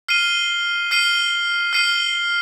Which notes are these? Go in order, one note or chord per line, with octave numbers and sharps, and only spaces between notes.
F6 C7 D#7 G7
F6 C7 D#7 G7
F6 C7 D#7 G7